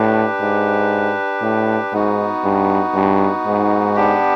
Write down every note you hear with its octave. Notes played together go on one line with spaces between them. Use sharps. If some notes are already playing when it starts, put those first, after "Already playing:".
Already playing: A2 D4 G4 B4
G#2
A2
G#2 B3 D#4 F#4
G2
G2
G#2
B3 D4 G4